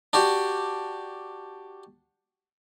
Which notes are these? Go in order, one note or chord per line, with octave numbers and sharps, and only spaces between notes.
D4 F#4 G4